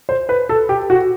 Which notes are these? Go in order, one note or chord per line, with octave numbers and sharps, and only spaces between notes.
C5
B4
A4
G4
F#4